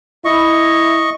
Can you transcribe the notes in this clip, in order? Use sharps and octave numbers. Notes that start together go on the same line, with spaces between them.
E4 D#5 C#6